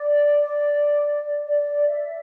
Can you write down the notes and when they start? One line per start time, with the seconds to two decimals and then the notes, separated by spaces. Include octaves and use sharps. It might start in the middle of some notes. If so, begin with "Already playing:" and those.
Already playing: D5
1.46 D5
1.87 E5